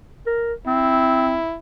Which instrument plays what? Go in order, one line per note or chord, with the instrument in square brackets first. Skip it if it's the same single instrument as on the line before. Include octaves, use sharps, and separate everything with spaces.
[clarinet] A#4
[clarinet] C4 [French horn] E4